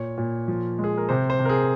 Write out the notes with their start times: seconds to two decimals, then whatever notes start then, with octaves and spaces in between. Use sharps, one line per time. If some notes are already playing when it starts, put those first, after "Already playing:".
Already playing: A#2 C#5
0.18 A#2
0.48 F3
0.79 G#3
0.84 G#4
0.97 A#4
1.09 C3 C5
1.30 C5
1.39 C3
1.45 A#4
1.49 G#4